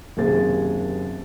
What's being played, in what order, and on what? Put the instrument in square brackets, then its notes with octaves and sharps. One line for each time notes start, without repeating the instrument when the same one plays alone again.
[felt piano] F#1 D#2 C3 G#4 C5 A6